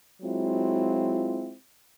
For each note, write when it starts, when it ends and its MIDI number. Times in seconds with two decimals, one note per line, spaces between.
0.22 1.52 54
0.22 1.52 56
0.22 1.52 60
0.22 1.52 64
0.22 1.52 65